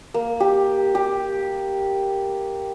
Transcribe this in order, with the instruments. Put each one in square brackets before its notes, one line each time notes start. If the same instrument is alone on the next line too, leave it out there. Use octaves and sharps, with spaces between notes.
[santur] A#3
G4
G4